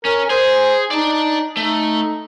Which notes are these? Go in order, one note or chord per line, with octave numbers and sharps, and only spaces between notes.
C#4 A#4
G#4 C5
D#4 D5 A5
A3 D#4